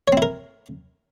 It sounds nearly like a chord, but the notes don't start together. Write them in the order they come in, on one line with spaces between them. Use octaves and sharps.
C#5 C4 E4 A#4